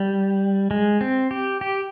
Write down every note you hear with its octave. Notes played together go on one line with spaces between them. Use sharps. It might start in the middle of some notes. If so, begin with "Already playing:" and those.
Already playing: G3
G#3
C4
G4
G4